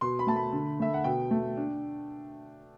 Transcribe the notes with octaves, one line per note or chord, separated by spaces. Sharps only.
B2 C6
B5
A3 A5
B5
D3
A3 E5
F#5
B2 G5
A3
D4